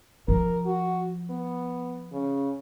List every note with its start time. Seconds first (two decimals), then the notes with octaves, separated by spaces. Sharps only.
0.28 F3 A#4
0.66 F#4
1.30 B3
2.12 C#3